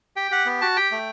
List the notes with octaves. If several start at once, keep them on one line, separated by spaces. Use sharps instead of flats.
G4 G5
G4 F#5
B3
F#4 A5
G4 G5
A3